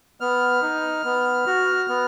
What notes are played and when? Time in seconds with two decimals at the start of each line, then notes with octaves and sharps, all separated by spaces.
0.20 B3 F6
0.62 D#4
1.05 B3
1.47 F#4
1.89 B3